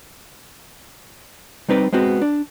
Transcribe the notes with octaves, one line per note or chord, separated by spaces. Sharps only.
G3 C4 D#4 B4 D5
G#3 B3 C4 F#4
D4